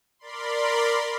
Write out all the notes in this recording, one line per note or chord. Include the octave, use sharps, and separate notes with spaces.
A#4 D5 B5 C6